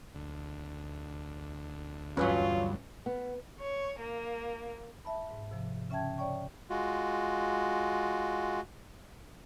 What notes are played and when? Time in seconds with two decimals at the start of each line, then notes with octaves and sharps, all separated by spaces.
0.15 D2
2.17 E2 G2 F#3 C#4 F4 B4
3.06 B3
3.61 C#5
3.99 A#3
5.05 E5 A5 B5
5.31 G#2
5.51 C3 F3
5.90 C#3 C#4 E5 G5 A5 G#6
6.18 C#5 D5 G5 C#6
6.70 G#3 F4 F#4